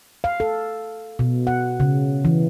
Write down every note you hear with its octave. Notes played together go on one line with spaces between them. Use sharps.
F5
A4
B2
F#5
C#3
E3